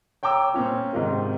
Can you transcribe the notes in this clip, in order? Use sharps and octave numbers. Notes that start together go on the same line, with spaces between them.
C#5 G5 A#5 D6 E6
A#2 C4 C#4 F4
G#1 G#2 C3 D#3 F4 A#4